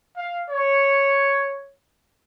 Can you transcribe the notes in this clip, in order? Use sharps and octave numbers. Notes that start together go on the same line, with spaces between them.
F5
C#5